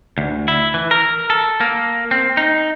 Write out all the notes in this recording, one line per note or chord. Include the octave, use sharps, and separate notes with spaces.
D2
E4
E3
A#4
A4
A#3
C4
D#4